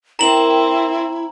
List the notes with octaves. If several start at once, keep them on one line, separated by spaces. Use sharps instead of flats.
C4 E4 A#4 G5 A#5 F#7